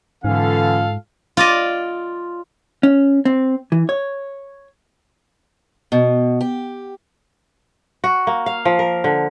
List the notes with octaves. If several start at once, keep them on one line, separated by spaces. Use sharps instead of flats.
G#2 D3 E3 C#4 F4 A4 F5
F4 D5 D#5
C#4
C4
E3
C#5
B2
G4
F#4
A#3
F5
F3
A#4
D3